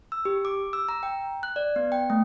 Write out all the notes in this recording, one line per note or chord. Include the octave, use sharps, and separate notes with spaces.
E6
G4
D6
E6
A#5
G5
F#6
D5
B3
G5
A3